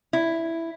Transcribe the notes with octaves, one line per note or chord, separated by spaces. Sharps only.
E4